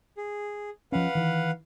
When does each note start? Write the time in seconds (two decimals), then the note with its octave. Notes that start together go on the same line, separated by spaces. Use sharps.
0.17 G#4
0.92 F3 C#4 B4 F5 F#5
1.15 D#3 E3